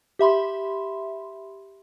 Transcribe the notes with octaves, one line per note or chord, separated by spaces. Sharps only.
G4 E5 B5 C6